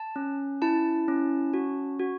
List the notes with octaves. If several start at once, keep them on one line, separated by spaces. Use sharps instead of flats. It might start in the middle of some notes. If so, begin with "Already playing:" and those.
Already playing: A5
C#4
E4 A5
C#4
F#4
F#4